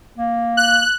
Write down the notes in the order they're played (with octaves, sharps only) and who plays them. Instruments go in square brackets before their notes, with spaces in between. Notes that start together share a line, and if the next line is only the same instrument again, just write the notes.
[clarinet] A#3
[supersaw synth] F#6